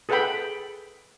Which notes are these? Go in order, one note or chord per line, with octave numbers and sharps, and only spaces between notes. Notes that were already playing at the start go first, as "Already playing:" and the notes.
G#4 A4 B4 F#5 G5 B5